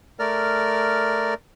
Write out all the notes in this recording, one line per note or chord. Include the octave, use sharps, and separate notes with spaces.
A3 A#4 D5 F6